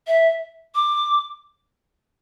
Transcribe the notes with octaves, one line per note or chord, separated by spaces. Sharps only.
E5
D6